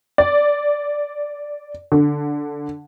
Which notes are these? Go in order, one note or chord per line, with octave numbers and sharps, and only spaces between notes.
D5
D3